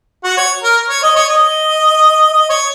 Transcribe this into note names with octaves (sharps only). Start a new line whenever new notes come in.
F#4
C#5
A#4
C#5
D#5
C#5
D#5
D#5
C#5